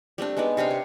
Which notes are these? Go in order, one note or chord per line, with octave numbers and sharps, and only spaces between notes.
G3 A3 C4 D4
G#3 B3 D#4 D5
C3 C4 D4 F5
C#5